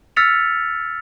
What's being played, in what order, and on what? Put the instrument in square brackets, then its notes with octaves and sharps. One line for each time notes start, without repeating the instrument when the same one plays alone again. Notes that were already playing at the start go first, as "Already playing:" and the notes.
[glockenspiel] E6 F6 A6 B6 C#7 F7